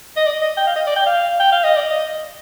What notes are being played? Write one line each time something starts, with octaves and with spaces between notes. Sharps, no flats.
D#5
D5
D#5
G5
F5
D#5
D5
G5
F5
G5
F5
D#5
D5
D#5